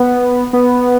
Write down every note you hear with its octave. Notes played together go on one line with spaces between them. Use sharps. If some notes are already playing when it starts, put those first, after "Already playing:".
Already playing: B3
B3